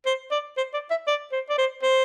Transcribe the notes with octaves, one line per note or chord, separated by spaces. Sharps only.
C5
D5
C5
D5
E5
D5
C5
D5
C5
C5